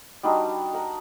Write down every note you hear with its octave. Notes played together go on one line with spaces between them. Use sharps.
G3 D4 D#4 F#4
A#4 F#5